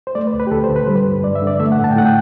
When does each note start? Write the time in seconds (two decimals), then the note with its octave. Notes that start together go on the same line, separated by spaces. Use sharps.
0.07 C5
0.15 A3 D5
0.27 B4
0.33 D2
0.40 B4
0.47 G4
0.51 D2 A4
0.64 C5
0.69 D3
0.76 B4
0.86 G3 C5
0.95 B4
1.06 G2
1.24 G2 D5
1.35 E5
1.42 D3
1.47 D5
1.60 A3 E5
1.72 F#5
1.78 A2
1.84 A5
1.91 G5
1.96 A2 F#5
2.05 G5